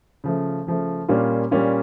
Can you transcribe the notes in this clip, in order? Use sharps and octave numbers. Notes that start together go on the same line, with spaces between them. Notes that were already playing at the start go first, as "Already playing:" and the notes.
C#3 F3 A3
C#3 F3 A3
A#2 G3 A#3 C#4 F4
A#2 G3 A#3 C#4 F4